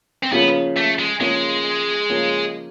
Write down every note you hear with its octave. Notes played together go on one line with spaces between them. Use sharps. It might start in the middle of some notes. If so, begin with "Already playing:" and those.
C4
C#3 F3 A#3 B3 C#4
A3
G#3
C#3 F3 G#3 A#3 C#4
C#3 F3 A#3 C#4